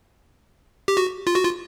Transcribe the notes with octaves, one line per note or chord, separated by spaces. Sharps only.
G4
F#4
F4
F#4
F4